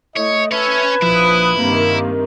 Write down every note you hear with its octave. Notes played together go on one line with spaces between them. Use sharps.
A3 E4 C#5 D#5
C#4 B4 C#5 E5 A5 G#6
A#1 F3 E4 D#6 F#6
G2 C3 D#3 A#3